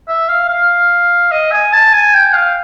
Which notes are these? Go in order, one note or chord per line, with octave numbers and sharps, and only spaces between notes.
E5
F5
F5
D#5
G#5
A5
G#5
G5
F5